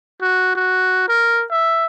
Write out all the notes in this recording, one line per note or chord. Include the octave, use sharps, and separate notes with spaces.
F#4
F#4
A#4
E5